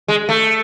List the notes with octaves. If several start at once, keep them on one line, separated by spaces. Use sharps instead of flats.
G#3
A3